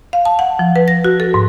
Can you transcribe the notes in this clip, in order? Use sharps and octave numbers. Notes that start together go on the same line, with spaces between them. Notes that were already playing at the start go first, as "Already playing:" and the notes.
F5
A5
F#5
F3
B4
A#6
F#4
A4
G#2